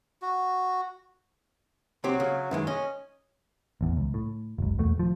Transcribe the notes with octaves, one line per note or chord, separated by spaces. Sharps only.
F#4
C2 F#3 C4 G4
C#3
F#2 D#3 E3 G#3
C#4 D#5
A1 E2
C#2
A2
F#1 C#2
E1 E2 A3
D#1 F3